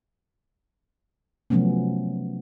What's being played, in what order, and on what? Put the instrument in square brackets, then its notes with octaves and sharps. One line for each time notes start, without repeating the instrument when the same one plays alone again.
[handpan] C3 F3 F#3 A3 B3 C#4